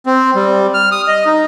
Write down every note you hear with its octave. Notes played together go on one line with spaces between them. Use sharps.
C4
G3
F6
D#6
D#5
D#4